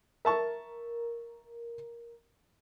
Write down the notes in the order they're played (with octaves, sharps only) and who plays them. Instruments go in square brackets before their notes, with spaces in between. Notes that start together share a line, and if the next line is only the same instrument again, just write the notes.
[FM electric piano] A#4 [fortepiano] E5 A5 C#6